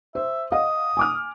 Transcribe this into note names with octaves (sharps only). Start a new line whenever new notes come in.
C5 E5
D#5 F5 F#5 D#6
G#5 D6 F6